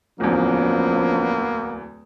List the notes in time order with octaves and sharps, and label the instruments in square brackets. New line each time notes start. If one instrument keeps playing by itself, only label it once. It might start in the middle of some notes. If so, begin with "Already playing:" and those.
[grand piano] D1 E2 [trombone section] F3 C#4 D4 [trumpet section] A#3 B3